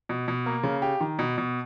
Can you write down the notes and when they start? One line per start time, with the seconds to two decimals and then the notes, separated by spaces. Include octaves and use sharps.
0.09 B2
0.28 B2
0.46 A#3
0.63 C#3
0.82 G4
1.01 D#3
1.19 B2
1.38 B2